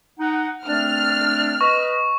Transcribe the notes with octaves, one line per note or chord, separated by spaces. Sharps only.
D#4 F#5
A3 C4 D4 F6
B4 D#5 C#6